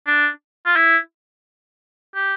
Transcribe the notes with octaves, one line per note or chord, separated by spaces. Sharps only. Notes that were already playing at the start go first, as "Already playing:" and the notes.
D4
F4
E4
G4